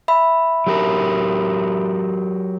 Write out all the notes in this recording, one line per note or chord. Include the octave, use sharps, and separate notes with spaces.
E5 B5
F#3 G4 A#4